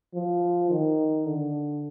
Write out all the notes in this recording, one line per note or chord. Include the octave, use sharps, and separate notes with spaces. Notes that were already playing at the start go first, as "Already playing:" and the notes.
F3
D#3
D3